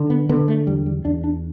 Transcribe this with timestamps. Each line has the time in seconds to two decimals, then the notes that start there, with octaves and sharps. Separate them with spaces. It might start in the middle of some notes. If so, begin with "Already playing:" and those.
Already playing: D3
0.10 B3
0.29 D3 B3
0.48 A3
0.67 E2 G3
0.86 G3
1.05 E2 D4
1.24 D4